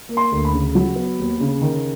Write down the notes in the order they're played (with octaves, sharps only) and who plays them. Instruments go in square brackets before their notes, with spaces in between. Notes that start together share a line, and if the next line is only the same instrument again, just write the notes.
[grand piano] A#3
C6
D2
B5
C#3
F#3
B3
D#2
C#3
D#3